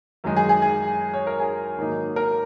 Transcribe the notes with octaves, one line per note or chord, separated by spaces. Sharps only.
F#2 D#3 G#3 D#4
G#4
G#4
G#4
C#5
A#4
G#4
G#2 D#3 F#3 A#3 D#4
A#4